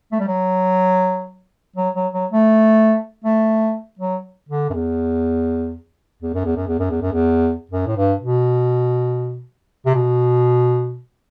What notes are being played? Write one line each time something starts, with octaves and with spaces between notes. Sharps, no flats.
A3
G3
F#3
F#3
F#3
F#3
A3
A3
F#3
D3
F#2
E2
E2
F#2
E2
F#2
E2
F#2
E2
F#2
E2
F#2
A2
G2
B2
C3
B2